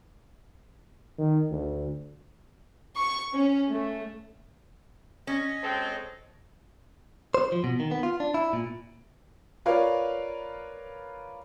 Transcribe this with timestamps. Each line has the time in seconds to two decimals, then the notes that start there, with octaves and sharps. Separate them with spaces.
1.18 D#3
1.51 D2
2.95 C#6
3.32 C#4
3.71 A3
5.27 C#4 C#5 D#5
5.63 G#3 C4 A4
7.35 C5
7.52 F3
7.64 B2
7.80 D#3
7.91 B3
8.03 F4
8.20 D4
8.34 E4
8.53 A#2
9.66 F4 A#4 B4 C#5 D5 F5